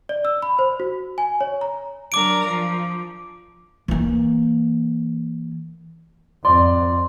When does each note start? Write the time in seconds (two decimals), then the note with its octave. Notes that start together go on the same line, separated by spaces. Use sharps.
0.09 D5
0.25 E6
0.42 B5
0.59 C5
0.80 F#4
1.18 G#5
1.41 C#5
1.61 A#5
2.12 F#3 D4 A#4 D6 D7
2.47 F3
3.88 E3 A#3
6.45 F2 D5 C6